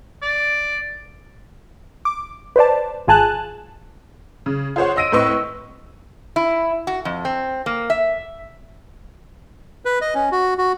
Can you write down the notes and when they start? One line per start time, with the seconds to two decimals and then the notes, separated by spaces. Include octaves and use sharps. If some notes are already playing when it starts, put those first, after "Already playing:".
0.22 D5
2.05 D6
2.56 B4 C5 D5 A5
3.07 G#1 F4 G#4 G#5 A5 F#6
4.46 C#3
4.76 F4 G#4 C5 C#5 F#5
4.96 D#5 C6 E6 A#6 D7 D#7
5.12 A2 C4 B4 D#5 C#6 E6
6.36 E4
6.87 F#4
7.05 F2
7.25 C4
7.66 A#3
7.90 E5
9.85 B4
10.01 D#5
10.15 C#4
10.32 F#4
10.58 F#4